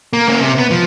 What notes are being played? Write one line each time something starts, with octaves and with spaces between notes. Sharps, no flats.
A#3
A#3 C#4
C3
B3
F3